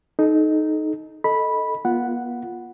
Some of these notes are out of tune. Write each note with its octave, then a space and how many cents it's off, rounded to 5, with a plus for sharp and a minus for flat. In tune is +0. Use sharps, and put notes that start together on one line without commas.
D#4 +0 A4 -35
A4 +0 D#5 +0 B5 -10
B3 -45 F4 +0 F#5 +0